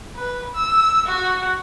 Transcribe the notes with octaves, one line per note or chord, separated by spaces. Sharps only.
B4
E6
F#4